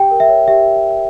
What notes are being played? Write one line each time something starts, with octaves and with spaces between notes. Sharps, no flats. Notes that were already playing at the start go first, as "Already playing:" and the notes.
Already playing: G4 G5
A#4
E5
C#5
G4 E5